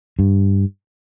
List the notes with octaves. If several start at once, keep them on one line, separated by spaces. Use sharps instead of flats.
G2